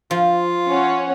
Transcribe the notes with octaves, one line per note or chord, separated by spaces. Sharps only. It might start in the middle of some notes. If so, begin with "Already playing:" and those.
F3 F4
C#4 C#5 F#5